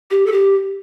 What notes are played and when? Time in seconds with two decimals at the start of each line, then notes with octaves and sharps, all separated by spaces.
0.11 G4
0.26 A4
0.32 G4